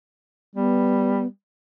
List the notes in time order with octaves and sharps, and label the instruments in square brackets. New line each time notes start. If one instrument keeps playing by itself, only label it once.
[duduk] G3 [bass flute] B3